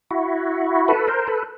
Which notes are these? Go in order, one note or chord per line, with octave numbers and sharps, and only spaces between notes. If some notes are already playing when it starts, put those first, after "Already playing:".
E4 F#4
A4 B4
A#4 C5
A4 B4